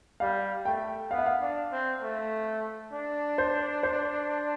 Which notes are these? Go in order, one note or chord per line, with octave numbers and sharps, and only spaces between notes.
G3 F5
A3 G5
B3 F5
E5
F5
D4
C4
A3
D4
C5
C5